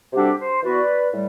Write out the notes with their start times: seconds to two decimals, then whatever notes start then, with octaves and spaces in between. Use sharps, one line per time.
0.13 C3 G3 D4 F#4 G4 A4
0.39 C5
0.62 E3 B3 F#4 B4 D5
1.13 A2 G3